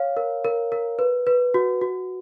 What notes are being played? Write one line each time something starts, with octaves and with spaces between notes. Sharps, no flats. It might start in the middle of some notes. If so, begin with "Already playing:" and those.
Already playing: C#5 F5
A#4
A#4
A#4
B4
B4
F#4
F#4